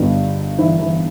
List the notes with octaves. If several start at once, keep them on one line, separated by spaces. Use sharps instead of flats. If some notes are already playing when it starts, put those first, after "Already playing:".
Already playing: G1 G2 D3 G3 B3 D#4
E3 E4
E3 E4